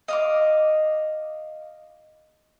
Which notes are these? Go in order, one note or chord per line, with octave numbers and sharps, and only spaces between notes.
D#5 F5 D6